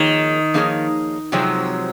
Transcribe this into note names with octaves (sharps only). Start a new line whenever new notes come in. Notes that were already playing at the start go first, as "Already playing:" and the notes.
Already playing: D#3 F3 A#3 D#4 G#4 C#5
F3 A#3 D#4 G#4 C#5
C3 F3 F#3 G#3 C4